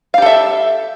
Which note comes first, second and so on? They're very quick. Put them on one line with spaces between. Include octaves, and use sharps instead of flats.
F5 G4 A4 E5